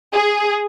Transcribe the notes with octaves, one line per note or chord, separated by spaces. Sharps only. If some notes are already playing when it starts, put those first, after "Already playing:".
G#4